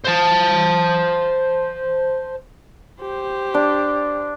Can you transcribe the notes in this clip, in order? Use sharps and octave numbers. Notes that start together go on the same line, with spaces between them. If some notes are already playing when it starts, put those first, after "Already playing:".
C5 A5
G4 C5
D4